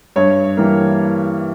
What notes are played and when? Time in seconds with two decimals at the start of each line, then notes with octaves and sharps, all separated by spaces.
0.16 G2 C#5
0.57 E3 G3 A#3